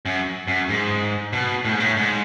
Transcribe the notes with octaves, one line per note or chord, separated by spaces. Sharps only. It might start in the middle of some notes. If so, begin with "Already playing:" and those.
F#2
F#2
G#2
B2
A2
G#2
A2
G#2